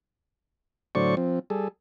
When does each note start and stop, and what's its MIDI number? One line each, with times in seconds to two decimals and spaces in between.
0.95 1.15 45
0.95 1.15 50
0.95 1.15 54
0.95 1.15 72
0.95 1.15 74
0.95 1.15 85
1.17 1.39 53
1.17 1.39 60
1.50 1.68 55
1.50 1.68 68
1.50 1.68 69